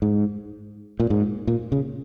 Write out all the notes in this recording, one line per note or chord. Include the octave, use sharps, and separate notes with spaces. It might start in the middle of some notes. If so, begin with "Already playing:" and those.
G#2
A#2
G#2
A#2
C#3